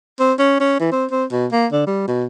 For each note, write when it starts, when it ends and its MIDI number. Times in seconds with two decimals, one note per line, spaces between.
0.20 0.33 60
0.39 0.59 61
0.60 0.76 61
0.80 0.90 52
0.92 1.06 60
1.11 1.25 60
1.32 1.47 47
1.52 1.67 58
1.72 1.82 50
1.87 2.05 55
2.08 2.26 47